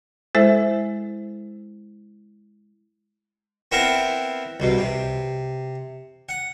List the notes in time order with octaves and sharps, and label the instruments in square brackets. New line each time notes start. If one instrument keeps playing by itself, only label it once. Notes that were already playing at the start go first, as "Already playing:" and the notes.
[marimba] G#3 E4 A4 C5 E5
[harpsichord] B3 C4 E4 A#4 F#5
C2 B2
C3
F#5